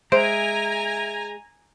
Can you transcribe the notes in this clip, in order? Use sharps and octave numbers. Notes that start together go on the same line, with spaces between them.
G#3 C5 E5 G#5 A#5 D7